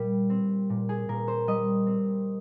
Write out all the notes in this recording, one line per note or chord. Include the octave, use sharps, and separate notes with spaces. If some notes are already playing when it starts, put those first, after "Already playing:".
Already playing: A#2 G3
C4
A#2
G#4
A#2 A#4
C5
G3 D#5
C4